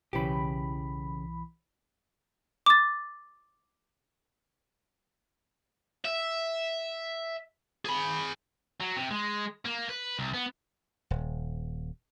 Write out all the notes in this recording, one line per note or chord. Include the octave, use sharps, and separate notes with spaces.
B1 C#3 E3 G4 B5
D6 A6
E5
G#4 B5
F#3
C3
G#3
A#3
B4
C2
B3
D#1